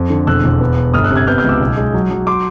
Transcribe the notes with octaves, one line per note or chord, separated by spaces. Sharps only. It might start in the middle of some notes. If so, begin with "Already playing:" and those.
Already playing: F2
D3
E1 E6 F#6
E1
B3
B3
G1 D#6 F6
E6 F#6
C3
F#6 G#6
B3 F6 G6
F6 G6
C#2 D6 E6
B1
G#3
F#3
F#3
C6 D6